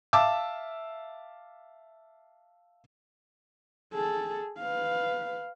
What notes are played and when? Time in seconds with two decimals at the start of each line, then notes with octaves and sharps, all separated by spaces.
0.13 E5 F5 A5 D6 E6
3.94 G#4 A4
4.59 B4 F5